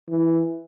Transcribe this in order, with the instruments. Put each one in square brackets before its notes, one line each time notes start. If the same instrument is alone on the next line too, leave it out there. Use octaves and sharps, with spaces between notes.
[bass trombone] E3